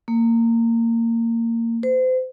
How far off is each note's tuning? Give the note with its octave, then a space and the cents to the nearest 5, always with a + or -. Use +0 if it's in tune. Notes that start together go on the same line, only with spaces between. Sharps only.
A#3 -20
C5 -35